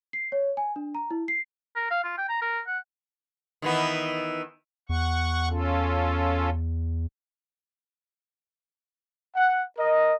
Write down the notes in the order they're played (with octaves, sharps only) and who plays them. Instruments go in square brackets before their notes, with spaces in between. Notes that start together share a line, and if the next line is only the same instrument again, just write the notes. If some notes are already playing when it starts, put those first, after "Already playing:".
[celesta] C7
C#5
G#5
D4
A#5
E4
C7
[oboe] A#4
F5
F4
G5
A#5
A#4
F#5
[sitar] D#3 E3 B3
[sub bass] E2 [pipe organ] F#5 C#6
[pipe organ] C#4 F4 A4
[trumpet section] F#5
A#4 D#5